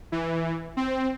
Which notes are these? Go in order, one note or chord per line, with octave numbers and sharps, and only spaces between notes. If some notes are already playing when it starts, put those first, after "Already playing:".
E3
C4